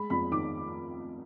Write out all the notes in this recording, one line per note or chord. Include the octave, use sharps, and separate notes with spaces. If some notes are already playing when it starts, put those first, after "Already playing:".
Already playing: G#3 B5
F2 B5
D#3 D6